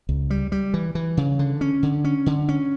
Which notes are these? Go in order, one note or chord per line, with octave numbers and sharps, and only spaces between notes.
C#2
G3
G3
E3
E3
C#3
D3
C#4
D3
C#4
D3
C#4